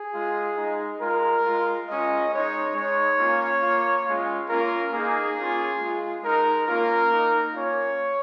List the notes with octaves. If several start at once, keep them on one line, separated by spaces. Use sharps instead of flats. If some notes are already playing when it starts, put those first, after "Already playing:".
Already playing: G#4
G#3 F4
G#3 D#4
G#3 F4 A#4
G#3 F4
G#3 C#4 F4 D#5
G#3 D#4 C#5
G#3 C#5
D#4
A#3 C#4 F4
A#3 F4
G#3 C#4 F4
A#3 C#4 F4 A#4
A#3 D#4 G#4
A#3 C#4 F4
G#3 F4
G#3 D#4 A#4
A#3 C#4 F4 A#4
A#3 D#4
A#3 C#4 F4 C#5